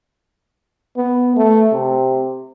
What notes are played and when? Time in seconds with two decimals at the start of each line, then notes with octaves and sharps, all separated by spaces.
0.97 B3
1.36 A3
1.72 C3